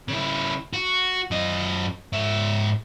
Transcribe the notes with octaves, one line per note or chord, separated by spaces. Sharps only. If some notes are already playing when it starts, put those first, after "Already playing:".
C#3 E4
F#4
F#2 D#5
G#2 E5